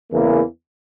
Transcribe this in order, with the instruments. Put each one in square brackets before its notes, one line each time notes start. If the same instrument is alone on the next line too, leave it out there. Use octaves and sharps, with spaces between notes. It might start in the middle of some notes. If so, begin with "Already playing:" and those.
[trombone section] E2 C#3 E3 A#3 E4